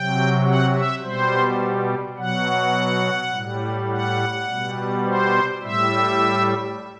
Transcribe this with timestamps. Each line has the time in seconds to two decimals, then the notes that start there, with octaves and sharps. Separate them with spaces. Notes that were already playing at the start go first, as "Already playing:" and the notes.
Already playing: C3 F#3 G5
0.46 F#5
0.75 E5
1.03 B2 G3 C5
2.18 B2 F#3 F#5
3.33 A2 G3
3.91 F#5
4.47 B2 G3
5.05 C5
5.62 A2 G3 E5